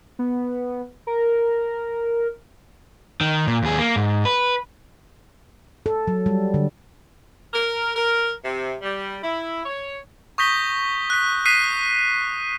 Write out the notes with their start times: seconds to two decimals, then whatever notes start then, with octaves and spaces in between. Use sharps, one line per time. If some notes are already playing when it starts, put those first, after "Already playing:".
0.19 B3
1.07 A#4
3.21 D#3
3.47 A#2
3.63 D#2 G#4
3.79 A#3
3.96 G#2
4.25 B4
5.86 A4
6.08 F#3
6.26 G3
6.54 D3
7.54 A#4
7.96 A#4
8.44 C3
8.82 G3
9.22 E4
9.66 C#5
10.38 C#6 D#6 G6 A#6 B6 G7
11.10 F#6 B6
11.46 D#6 F#6 B6 C7 D#7